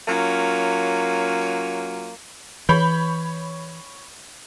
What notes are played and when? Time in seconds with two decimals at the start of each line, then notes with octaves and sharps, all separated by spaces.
0.08 F#3 A#3 C#4 F4
2.69 E3 C#5 B5 G6